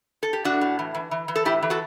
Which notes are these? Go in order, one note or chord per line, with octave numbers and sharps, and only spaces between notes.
A4
G4
A2 D4 F#4
A2
E3
E3
E3
E3
A4
A2 E4 G4
E3
F#4 A4